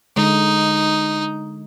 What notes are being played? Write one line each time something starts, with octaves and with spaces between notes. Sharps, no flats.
D3 G#3 D4 D#4